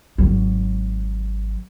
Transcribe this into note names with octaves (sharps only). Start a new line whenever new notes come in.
G#1 F#3